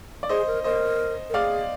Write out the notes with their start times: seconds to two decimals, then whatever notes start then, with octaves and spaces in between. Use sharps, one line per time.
0.23 D5
0.29 G#4 C5 D#5
0.47 A#4
0.64 A#4 C5 D#5
1.30 A#4
1.34 G#4 D5 F5